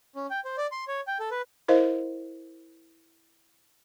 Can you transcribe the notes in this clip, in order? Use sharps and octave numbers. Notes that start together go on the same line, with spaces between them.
C#4
G5
C5
D5
C6
C#5
G5
A4
B4
E4 A#4 C5 D#5 F5